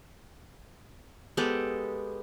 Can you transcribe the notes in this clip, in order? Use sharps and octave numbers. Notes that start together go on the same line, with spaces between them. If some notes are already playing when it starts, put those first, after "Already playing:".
G#3 B3 G4 A4